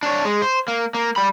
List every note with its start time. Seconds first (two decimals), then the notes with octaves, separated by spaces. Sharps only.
0.03 D4 C#5
0.25 G#3
0.42 C5
0.68 A#3
0.94 A#3
1.16 G3 B5